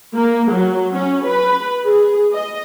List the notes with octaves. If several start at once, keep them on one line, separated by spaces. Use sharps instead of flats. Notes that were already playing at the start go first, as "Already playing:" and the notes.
A#3
F#3
C#4
B4
G#4
D#5